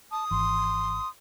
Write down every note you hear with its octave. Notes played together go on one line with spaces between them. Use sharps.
A5 D#6
G#1 E3 C6